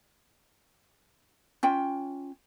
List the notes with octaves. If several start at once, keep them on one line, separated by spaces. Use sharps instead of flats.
C#4 F4 G5